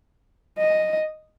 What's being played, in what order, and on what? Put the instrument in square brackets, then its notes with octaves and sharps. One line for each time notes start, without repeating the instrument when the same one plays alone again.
[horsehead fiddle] D#5